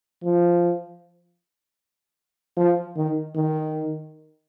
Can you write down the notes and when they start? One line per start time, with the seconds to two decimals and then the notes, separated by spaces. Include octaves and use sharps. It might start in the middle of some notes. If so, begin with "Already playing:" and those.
0.24 F3
2.57 F3
2.97 D#3
3.36 D#3